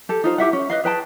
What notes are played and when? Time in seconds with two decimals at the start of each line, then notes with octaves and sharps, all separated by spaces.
0.09 G4 A4
0.24 D#4 F4 C5
0.38 E4 G4 E5 F#5
0.53 C#4
0.70 B4 D#5 F5
0.83 G#4 B4 G5 A5